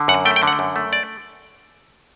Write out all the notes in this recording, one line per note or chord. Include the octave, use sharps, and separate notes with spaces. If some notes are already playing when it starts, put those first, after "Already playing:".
Already playing: D3
F#2 F#5
A3 G5
G5
D3 F#5
F#2
A3
D5